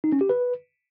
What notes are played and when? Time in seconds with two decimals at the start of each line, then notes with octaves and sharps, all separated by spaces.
0.04 D#4
0.12 C#4
0.21 G4
0.29 B4